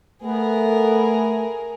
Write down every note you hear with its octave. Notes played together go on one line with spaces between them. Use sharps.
A3 B3 G#4 A#4